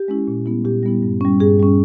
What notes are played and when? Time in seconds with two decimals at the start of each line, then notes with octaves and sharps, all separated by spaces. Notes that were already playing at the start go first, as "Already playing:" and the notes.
Already playing: G4
0.08 G#3 C#4 E4
0.28 A#2
0.46 G3 B3 E4
0.65 A#2 G4
0.83 G3 B3 E4
1.03 G2
1.21 G3 C#4
1.40 G2 G#4
1.60 G3 C#4